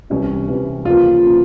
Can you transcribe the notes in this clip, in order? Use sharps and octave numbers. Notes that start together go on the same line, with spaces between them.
C2 C3 E3 G3 C#4
C2 C3 E3 G3
E2 C#3 F3 A#3 F4
C#3 F3 A#3